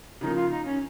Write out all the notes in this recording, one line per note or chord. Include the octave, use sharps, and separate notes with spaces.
C#3 F3 A#3 D#4
F4
D#4
C#4